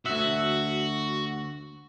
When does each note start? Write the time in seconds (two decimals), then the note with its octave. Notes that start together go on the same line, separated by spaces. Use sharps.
0.06 D2 F#4 E5